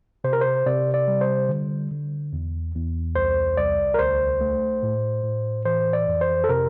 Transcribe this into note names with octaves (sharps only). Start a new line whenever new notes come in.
C3 C5
A#4
C5
C3 D5
D5
G3
C5
D3
D3
E2
E2
C2 C5
C2 D5
A#4
D2 C5
A3
A2
A2
E3 C5
D5
F2
C5
A4
C3 A#4